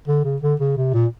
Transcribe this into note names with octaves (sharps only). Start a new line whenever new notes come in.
D3
C#3
D3
C#3
C3
A#2